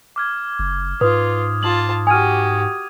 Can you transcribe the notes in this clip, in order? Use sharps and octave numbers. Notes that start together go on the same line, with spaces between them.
D6 F6 G#6
F#1
G#2 F4 B4 D#6
F4 A5 F#7
F#4 G4 G#5 D#6 F6 G#6 D#7